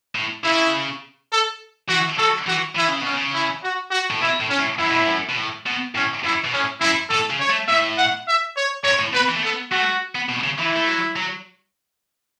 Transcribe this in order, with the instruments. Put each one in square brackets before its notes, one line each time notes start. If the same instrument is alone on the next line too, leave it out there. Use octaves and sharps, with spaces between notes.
[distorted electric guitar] A2
[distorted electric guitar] C#3 [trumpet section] E4
[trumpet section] A4
[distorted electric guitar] E3 [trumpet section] F#4
[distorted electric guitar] F#3 [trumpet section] A4
[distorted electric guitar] E3 [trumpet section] F#4
[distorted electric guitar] E3 [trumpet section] E4
[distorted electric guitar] C#3
[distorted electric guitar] B2 [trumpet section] C#4
[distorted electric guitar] C#3
[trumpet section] E4
F#4
F#4
[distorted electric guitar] A2
[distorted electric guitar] B2 [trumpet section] E4
[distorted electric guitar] A2
[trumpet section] C#4
[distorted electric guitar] A2
[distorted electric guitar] F#2 [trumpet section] E4
[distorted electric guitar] B2
A2
F#2
B2
A2
B2
[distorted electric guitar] A2 [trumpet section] C#4
[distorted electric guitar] F#2 [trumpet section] E4
[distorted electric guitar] B2
[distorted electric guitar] A2 [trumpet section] C#4
[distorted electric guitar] F#2 [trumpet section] E4
[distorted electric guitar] A2 [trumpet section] A4
[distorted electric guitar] C#3
[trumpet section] C#5
[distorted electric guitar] A3
[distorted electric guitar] A2 [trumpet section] E5
[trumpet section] F#5
E5
C#5
[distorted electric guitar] F#2 [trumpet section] C#5
[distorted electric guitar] A2
[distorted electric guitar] B2 [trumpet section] B4
[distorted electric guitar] E3
A3
[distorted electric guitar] B3 [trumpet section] A4
[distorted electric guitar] A3 [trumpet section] F#4
[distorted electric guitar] B3
B2
C#3
[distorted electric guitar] E3 [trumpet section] E4
[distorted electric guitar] A3
F#3
F#3